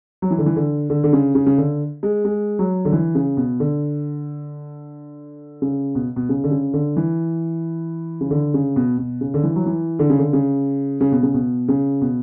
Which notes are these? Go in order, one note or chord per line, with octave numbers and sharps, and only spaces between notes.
F#3
E3
D3
E3
D3
D3
D3
C#3
C#3
C#3
D3
G#3
G#3
F#3
D3
E3
C#3
B2
D3
C#3
B2
B2
C#3
D3
C#3
D3
E3
C#3
D3
C#3
B2
B2
C#3
D3
E3
F#3
E3
D3
C#3
D3
C#3
C#3
B2
C#3
B2
C#3
B2